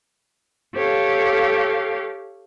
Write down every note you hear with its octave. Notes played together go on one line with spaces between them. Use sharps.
G4 A4 C#5 F5